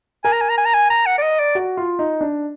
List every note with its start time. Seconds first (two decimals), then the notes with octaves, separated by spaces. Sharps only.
0.24 A#4 G#5
0.33 A#5
0.41 G#5
0.49 A#5
0.58 G#5
0.66 A#5
0.74 G#5
0.90 A#5
1.06 F#5
1.18 D5
1.23 D#5
1.39 D5
1.55 F#4
1.77 F4
1.99 D#4
2.21 D4